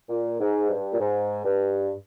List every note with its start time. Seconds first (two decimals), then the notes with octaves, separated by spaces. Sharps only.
0.09 A#2
0.40 G#2
0.70 G2
0.93 A#2
1.00 G#2
1.45 G2